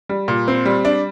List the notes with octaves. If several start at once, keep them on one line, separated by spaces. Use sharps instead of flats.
G3
A#2
C4
G3
D4